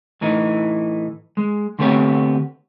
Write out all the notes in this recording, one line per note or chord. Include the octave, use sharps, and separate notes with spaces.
A2 E3 D#4
G#3
D3 A3 B3 C4 G4 C#5